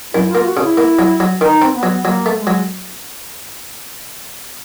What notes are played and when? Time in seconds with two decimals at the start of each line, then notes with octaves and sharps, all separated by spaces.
0.14 F#2 E4
0.30 F4
0.35 A#3
0.46 F#4
0.57 C#3
0.62 E4
0.77 A#3
0.99 F#3
1.20 F#3
1.41 D#3 D#4
1.62 C4
1.73 B3
1.83 F#3
2.04 F#3 A#3
2.26 A3
2.36 G#3
2.47 F#3